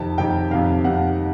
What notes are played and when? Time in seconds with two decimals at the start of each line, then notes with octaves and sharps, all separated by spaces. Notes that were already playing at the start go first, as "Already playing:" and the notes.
Already playing: F2 C3 D#3 A5
0.18 F2 C3 D#3 G5
0.51 F2 C3 D#3 F5
0.84 F2 C3 D#3 F#5